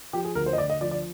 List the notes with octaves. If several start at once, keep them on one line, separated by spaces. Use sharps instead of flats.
F3 G4
G#4
D2 A#4
C5
D#5
D2 D5
D#5
F3 D5
D5